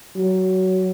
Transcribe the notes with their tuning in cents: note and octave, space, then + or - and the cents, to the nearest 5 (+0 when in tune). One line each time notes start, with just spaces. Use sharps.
F#3 +15